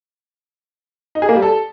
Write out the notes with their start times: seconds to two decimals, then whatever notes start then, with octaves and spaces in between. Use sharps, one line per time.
1.15 D#4
1.22 G#4
1.29 A#3
1.36 G3
1.42 A4